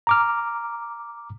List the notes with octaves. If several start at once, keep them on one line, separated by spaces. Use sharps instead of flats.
A#5 D6 F6